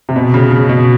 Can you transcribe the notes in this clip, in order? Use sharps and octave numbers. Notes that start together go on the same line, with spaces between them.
C3
B2
C#3
C#3
B2